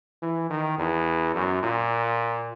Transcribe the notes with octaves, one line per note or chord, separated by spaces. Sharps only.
E3
D#3
E2
F#2
A#2